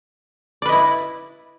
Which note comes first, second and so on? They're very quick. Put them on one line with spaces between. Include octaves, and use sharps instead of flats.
D5 B4 D#5 E4